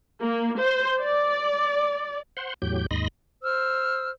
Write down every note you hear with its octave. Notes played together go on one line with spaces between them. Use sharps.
A#3
C5
D5
C5 F#5 C6
E2 A2 F#3 G4 G6
D#2 G#2 D#5 B5 C6 A#6
C5 E6 F6